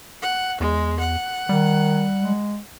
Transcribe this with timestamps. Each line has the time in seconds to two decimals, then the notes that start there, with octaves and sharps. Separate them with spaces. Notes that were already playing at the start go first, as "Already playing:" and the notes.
0.22 F#5
0.60 E2 G#3
0.99 F#5
1.49 D#3 G3
2.21 G#3